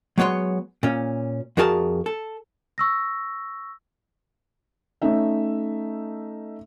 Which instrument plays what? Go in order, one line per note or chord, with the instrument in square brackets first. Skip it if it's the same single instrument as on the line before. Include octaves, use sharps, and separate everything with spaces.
[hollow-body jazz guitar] F#3 G#3 B3 C#5 C6
A#2 C#4
F2 F#4 G#4 A#4 A5
A4
[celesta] C#6 E6 A#6
[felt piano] A3 C#4 D#4 E5